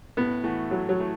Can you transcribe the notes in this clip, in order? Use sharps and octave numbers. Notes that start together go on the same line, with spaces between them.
A2 B3
E3 A3 F#4
A2 F#3
F#3
E3 A3